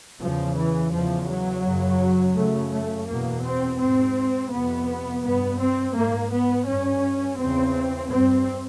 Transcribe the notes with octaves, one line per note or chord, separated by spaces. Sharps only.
E2 C#3 F3
E3
E2 C#3 F3
F#3
F#2 C#3
F#2 C#3 A3
A3
E2 B2 A#3
C4
G#2 C4
F2 C3 B3
G2 B3
C4
G#2 A#3
B3
G2 C#4
E2 C#3 C4
G2 C4